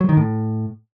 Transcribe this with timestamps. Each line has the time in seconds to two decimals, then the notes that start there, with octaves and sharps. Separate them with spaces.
0.01 F#3
0.09 D#3
0.17 A2